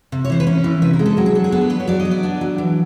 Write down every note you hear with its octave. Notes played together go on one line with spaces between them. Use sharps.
C3
C#5
E3 C5
B4
C#4 A#4
E3
C3 B4
A#4
G#3
A4
F#3 A#4
G#4
D4 A4
G#4
B3 A4
A#4
D4 B4
C#5
F#3 D5
D#5
B3
D5
D4
F#3
E3